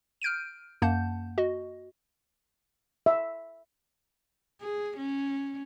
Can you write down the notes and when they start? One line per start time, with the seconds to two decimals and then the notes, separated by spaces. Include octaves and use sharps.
0.22 F6 G6 D7 D#7
0.82 F#2 A#3 F#5 A5 G6
1.38 F#4 D#5
3.06 E5
4.61 G#4
4.98 C#4